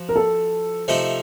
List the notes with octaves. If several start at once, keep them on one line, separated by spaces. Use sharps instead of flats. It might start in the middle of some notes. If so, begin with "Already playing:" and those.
Already playing: F3 F#4
A#4
A4
C3 F3 A3 D#4 A4